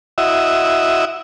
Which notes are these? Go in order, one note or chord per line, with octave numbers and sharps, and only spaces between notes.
E4 F#4 D#5 E5